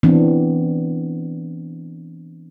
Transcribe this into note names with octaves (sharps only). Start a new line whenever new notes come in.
E3 B3 C4 D4